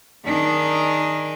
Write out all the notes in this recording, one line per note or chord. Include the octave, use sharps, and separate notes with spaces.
D#3 D4 D#4 G#4 A#4